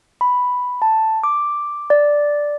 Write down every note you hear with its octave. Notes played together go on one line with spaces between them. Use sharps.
B5
A5
D6
D5